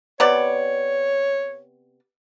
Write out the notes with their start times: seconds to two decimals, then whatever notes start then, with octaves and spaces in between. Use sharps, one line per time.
0.20 C3 B3 C#5 D5